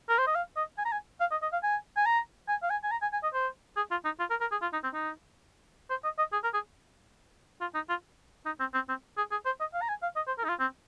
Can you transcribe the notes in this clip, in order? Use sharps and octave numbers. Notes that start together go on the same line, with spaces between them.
A#4
C5
D#5
F5
D#5
G#5
A#5
G#5
F5
D#5
D#5
F5
G#5
G#5
A#5
G#5
F5
G#5
G#5
A#5
G#5
G#5
D#5
C5
G#4
F4
D#4
F4
A#4
A#4
G#4
F4
D#4
C4
D#4
C5
D#5
D#5
G#4
A#4
G#4
F4
D#4
F4
D#4
C4
C4
C4
G#4
G#4
C5
D#5
F5
A#5
G#5
F5
D#5
C5
A#4
D#4
F4
C4